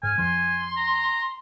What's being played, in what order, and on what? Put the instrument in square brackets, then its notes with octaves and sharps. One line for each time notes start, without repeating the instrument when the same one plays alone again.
[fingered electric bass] G#2 [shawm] G#5 [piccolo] F6
[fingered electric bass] F2 F3 [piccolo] C6
[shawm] A#5